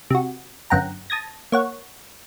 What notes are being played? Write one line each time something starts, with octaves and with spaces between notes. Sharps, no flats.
C3 F#4
G1 F#2 F#5 G5 A#5
A5 D#6 G#6 A#6
A#3 C#5 F#5